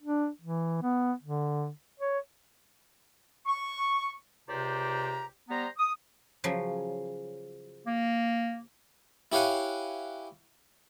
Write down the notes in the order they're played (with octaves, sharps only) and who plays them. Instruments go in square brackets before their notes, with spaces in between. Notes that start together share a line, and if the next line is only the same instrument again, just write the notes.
[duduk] D4
E3
B3
D3
C#5
[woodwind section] C#6
C#2 C3 G4 C5 D5 A#5
G3 B3 C5 A#5
D#6
[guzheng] C#3 F3 F#3
[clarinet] A#3
[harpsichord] E4 G4 C#5 F5 F#5 G#5